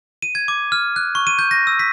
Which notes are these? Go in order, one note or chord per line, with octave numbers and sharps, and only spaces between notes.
D#7
G#6
D6
F6
F#6
C#6
D#7
G6
A#6
E6
B6